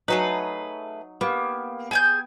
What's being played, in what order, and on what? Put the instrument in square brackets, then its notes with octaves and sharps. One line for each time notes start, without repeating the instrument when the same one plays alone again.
[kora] F#3 D#4 [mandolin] A3 G#4 B4
[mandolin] A#3 [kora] B3 G4
[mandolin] G#4 G#5 G6 [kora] G5